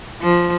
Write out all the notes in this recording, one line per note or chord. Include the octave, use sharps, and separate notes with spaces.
F3